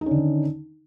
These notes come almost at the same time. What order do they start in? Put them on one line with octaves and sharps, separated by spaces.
D#4 C#4 D3 D#3